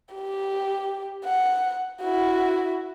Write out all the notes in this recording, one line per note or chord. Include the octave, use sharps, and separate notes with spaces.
G4
F#5
E4 F#4